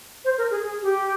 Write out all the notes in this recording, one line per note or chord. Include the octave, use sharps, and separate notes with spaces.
C5
A#4
G#4
G#4
G4